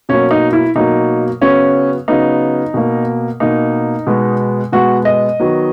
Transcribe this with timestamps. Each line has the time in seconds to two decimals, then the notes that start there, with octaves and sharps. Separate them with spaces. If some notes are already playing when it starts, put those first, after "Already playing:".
0.09 B2 F#3 A#3 C#4
0.31 D#4
0.53 E4
0.75 B2 F#3 A#3 D#4
1.41 C#3 F#3 B3 C#4
2.08 C#3 F#3 B3 D#4
2.74 B2 A#3
3.40 B2 A#3 D#4
4.07 B2 G#3 B3
4.72 B2 G#3 B3 F#4
5.05 D#5
5.39 D#3 F#3 B3